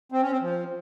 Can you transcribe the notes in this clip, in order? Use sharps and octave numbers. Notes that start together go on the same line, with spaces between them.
C4
C#4
C4
F3